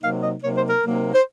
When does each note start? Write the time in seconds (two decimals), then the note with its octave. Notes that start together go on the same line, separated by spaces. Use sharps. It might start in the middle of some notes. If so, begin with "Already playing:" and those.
0.02 C3 F#3 A#3 D#4 F5
0.22 D#5
0.42 C3 F#3 A#3 D#4 C#5
0.56 C5
0.68 A#4
0.82 C3 F#3 A#3 D#4
1.14 C5